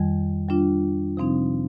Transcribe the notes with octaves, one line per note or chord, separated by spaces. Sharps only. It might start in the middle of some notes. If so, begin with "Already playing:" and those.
Already playing: F2 D#3 G3
G3 D4 F4
C3 F3 C4 D#4